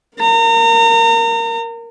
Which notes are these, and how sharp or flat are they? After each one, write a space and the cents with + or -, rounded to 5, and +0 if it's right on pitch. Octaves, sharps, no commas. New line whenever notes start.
A#4 +0 A#5 -35